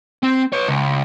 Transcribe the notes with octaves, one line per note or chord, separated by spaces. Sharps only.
C4
B4 C#5
C#2